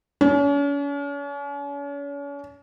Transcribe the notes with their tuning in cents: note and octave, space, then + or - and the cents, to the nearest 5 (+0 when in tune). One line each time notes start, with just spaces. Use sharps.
C#4 +40